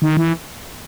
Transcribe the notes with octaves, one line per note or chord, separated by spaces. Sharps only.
D#3
E3